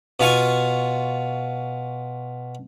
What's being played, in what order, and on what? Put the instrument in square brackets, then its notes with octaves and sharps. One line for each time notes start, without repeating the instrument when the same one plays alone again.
[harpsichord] B2 F4 G#5 C#6